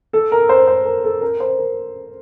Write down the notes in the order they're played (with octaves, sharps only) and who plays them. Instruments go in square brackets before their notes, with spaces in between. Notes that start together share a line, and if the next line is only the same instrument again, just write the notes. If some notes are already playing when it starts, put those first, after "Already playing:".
[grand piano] A4
A#4
C5
C5
A#4
A4
A#4
C5
A#4